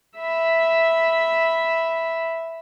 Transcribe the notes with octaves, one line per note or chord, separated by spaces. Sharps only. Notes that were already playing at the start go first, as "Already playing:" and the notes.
E5 B5